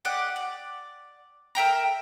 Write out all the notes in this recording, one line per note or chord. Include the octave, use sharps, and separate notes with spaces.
G4 D5 D#5 F#5
D5
A#4 E5 G5 A#5